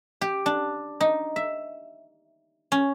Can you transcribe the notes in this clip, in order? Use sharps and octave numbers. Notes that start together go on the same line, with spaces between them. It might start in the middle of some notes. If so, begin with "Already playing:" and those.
G4
D4
D#4
E5
C#4